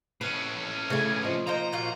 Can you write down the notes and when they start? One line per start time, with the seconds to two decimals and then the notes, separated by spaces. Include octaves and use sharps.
0.21 A2 C#4 B4
0.90 C#3 E3 A3 G#5
1.22 F3 D#5
1.47 A#3 D#4 C5 A#5
1.72 A#2 F4 F#4